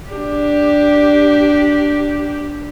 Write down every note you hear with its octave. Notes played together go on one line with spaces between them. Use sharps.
D4 G4